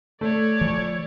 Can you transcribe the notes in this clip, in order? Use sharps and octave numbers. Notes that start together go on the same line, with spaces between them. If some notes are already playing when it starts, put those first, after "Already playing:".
A3 C#5 D5
E3 F3